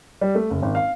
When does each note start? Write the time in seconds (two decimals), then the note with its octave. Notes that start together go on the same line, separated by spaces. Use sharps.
0.21 G3
0.35 A3
0.50 F#1
0.62 G#1
0.75 F5